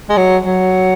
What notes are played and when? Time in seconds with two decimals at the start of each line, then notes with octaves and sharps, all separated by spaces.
0.10 G#3
0.17 F#3
0.46 F#3